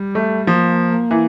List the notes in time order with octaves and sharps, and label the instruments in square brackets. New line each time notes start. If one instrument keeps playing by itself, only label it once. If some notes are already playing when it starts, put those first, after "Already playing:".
Already playing: [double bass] G3
[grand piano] A3
[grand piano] F3 [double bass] A#3
[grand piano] E3